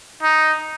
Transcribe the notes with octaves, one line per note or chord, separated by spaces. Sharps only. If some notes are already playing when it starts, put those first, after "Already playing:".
D#4